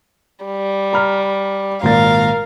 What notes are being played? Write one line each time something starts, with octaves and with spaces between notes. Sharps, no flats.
G3
A#5 B5 F6
G#1 A#2 A#4 F5 A6